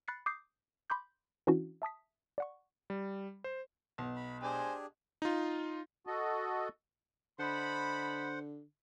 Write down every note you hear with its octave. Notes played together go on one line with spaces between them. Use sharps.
B5 F#6 A6 C7 C#7
D6 D#6 G6 C7
B5 C6 D6 G6
E3 C#4 D4 E4 F#4
E5 A5 D#6 B6
D5 F#5 C#6
G3
C5
B1
B5
D4 G4 G#4 C5 G#5
D#4 F4
F#4 A4 D#5
D3 C5 D#5 F#5 A5 B5